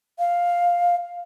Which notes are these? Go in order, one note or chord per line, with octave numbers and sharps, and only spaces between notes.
F5